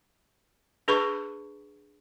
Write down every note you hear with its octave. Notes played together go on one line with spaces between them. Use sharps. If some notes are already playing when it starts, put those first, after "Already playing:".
D4 G#4 B4 B5 C#6